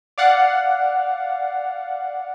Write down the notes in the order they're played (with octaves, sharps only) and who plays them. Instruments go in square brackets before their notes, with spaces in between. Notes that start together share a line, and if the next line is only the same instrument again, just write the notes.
[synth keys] D5 F5 F#5